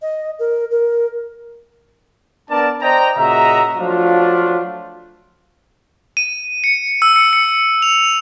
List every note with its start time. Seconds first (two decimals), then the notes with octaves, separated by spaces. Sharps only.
0.02 D#5
0.39 A#4
0.71 A#4
2.50 B3 D4 A#4 D5 A5
2.82 C5 D5 D#5 G5 A#5
3.17 A#2 C#3 F#4 D#5 E5 A#5
3.78 F3 F#3 A3 D4 F4
6.17 D#7
6.64 C#7
7.02 E6
7.16 C#7
7.33 C#7
7.82 F7